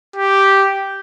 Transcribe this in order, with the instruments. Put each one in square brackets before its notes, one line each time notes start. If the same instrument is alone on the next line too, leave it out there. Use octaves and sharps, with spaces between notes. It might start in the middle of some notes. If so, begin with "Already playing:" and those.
[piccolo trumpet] G4